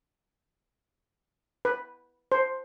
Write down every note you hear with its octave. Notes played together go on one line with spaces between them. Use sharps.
B4
C5